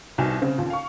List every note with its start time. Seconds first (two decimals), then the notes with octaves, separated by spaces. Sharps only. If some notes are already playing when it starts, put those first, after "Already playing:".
0.18 C2 B2 D#4 G#5 E7
0.42 C#3 C4
0.58 D#2 A#2
0.70 F5 C#6